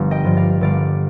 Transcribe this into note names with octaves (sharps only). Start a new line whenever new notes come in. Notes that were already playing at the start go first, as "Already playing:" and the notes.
Already playing: G1 F3 F5
D#5 G5
G2 F3
D5 F5
G1 D5 F5